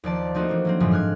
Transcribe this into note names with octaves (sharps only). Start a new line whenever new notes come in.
D#2 F3 D5 A5
F3 A3 A#3 C4 D#4 F#4
E3 A#3 D4
F#3 A#3 C4
F#2 A2 D3 E3 F3 G#3
G#2 F6 F#6 G#6